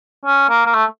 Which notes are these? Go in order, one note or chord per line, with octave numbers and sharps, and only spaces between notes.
C#4
A#3
A#3
A3